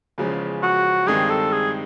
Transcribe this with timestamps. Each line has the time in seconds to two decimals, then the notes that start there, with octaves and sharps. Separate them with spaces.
0.18 E2 C#3 F3 G#3 C#4
0.63 F#4
1.07 G2 D#3 G#3 C4 G#4
1.30 A4
1.52 G#4